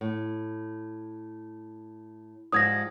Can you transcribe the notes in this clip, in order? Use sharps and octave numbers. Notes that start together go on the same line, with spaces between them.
A2
G#2 F3 G3 D#6 G#6 A#6